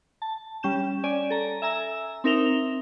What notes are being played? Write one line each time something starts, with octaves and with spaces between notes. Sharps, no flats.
A5
G3 C#4 G6 E7
C#4 D5 G#5 D#7
A4 A#5
E5 G#5 A#5 E6
C4 D#4 A#4 E5 F7 G7